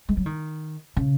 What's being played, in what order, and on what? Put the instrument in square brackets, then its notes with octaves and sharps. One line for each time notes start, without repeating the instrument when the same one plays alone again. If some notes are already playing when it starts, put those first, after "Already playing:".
[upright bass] G#3
F#3
D#3
C#3